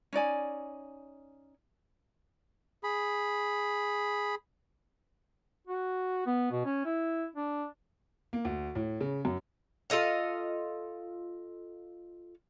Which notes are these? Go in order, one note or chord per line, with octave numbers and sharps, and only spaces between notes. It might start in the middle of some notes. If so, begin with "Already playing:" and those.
C#4 D#4 D5 G#5
G#4 B5
F#4
B3
B2
C#4
E4
D4
A#3
D2
A2
C#3
F#2
F4 A4 D#5 F5